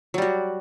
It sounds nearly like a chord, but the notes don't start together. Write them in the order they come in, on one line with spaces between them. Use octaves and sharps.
F#3 G3 F#4